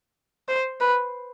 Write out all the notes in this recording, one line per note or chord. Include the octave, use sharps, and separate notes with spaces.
C5
B4